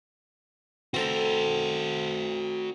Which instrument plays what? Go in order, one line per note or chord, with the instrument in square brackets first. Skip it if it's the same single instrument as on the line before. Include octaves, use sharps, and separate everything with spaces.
[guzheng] C4 A4 A#5 [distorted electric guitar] F#4 C5